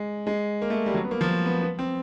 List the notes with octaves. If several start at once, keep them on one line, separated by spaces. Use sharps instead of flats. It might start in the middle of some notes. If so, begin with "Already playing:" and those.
Already playing: G#3
G#3
A#3
A3
G3
F#3
B3
A#3
F3
A#3
B3
B3
C4